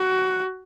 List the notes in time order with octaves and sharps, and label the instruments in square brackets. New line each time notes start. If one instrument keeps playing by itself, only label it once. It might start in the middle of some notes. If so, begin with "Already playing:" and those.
Already playing: [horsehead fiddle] F#4